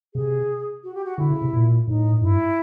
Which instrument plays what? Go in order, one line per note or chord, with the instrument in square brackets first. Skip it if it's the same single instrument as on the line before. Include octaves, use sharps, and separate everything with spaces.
[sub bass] C3 [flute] G#4
[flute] F#4
G4
F#4
[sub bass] D3 [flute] E4
[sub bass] C#3
C3
A#2
[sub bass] A2 [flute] D#4
[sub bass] G2 [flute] E4